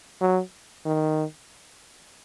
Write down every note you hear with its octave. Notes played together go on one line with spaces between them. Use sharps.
F#3
D#3